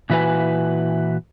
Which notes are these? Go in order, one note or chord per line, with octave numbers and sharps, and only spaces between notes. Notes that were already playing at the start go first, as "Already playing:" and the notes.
A#2 E3 E4 F#4 B4 G#5